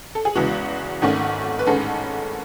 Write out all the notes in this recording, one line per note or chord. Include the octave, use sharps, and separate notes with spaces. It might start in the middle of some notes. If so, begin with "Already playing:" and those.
A4
G#4
E2 C#3 E3 G#3 B3 F#4
G#1 G#2 D#3 A3 C#4
B4
A1 G#2 D#3 G#3 C#4 A4